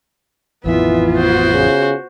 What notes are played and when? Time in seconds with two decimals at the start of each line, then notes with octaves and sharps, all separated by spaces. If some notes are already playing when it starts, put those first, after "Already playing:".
0.66 A1 F2 D#3 E3 B3 F4 E5
1.18 F#4 C5
1.52 C#3